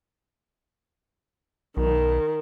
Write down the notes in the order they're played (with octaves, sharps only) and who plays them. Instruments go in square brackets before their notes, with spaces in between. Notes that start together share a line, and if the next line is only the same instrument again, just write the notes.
[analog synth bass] B1 [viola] D#3